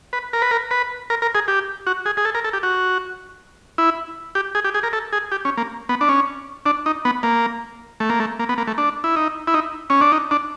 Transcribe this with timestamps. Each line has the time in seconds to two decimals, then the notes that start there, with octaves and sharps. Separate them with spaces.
0.13 B4
0.33 A#4
0.42 B4
0.51 A#4
0.71 B4
1.10 A#4
1.22 A#4
1.35 G#4
1.48 G4
1.87 F#4
2.06 G#4
2.17 G#4
2.25 A4
2.35 A#4
2.44 A4
2.53 G4
2.63 F#4
3.78 E4
4.35 G4
4.55 G#4
4.64 G4
4.74 G#4
4.83 A#4
4.93 A4
5.13 G#4
5.32 G4
5.45 C#4
5.57 A#3
5.89 B3
6.01 D4
6.09 C#4
6.66 D4
6.86 D#4
7.05 B3
7.23 A#3
8.00 A3
8.10 A#3
8.20 A3
8.39 A#3
8.49 B3
8.58 A#3
8.67 A3
8.78 D4
9.04 E4
9.16 D#4
9.47 E4
9.54 D#4
9.90 C#4
10.01 D4
10.12 D#4
10.31 D4